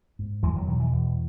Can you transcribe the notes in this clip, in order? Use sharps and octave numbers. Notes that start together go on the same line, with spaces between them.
G#2
E2 E3 G#3
D#3 F#3
B2 D#3 F#3
E3
E2